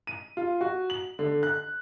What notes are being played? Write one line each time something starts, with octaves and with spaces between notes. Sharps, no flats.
D#7
F4
F#4
F#7
D3
F#6